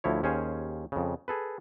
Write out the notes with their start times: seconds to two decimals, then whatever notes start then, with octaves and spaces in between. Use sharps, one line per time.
0.04 D2 F3 E4 C#5
0.23 D#2 C#4 G#4 C5 F5 G#5
0.92 F2 C#3
1.28 G#4 A4 B4